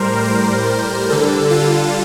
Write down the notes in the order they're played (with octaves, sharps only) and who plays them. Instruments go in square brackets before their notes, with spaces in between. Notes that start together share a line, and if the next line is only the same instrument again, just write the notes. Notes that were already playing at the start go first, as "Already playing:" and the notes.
Already playing: [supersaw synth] A2 G3 A#4 C5
A#4
D3 G3 A4
F4